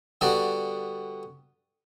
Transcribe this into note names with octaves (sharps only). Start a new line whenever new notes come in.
D3 G3 B3 F#4 D5